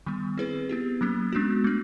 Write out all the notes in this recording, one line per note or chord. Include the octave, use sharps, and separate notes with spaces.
D#3 G3 B3
C4 E4 G#4 B4
B3 E4 G4
F#3 A#3 C#4
G#3 B3 D4 F#4
A3 D4